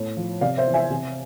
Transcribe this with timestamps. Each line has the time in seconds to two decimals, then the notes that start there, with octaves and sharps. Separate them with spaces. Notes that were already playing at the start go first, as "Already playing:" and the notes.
Already playing: A2
0.17 F3
0.41 C3 D5 F5
0.58 C5 E5
0.67 E3
0.74 E5 G#5
0.90 C3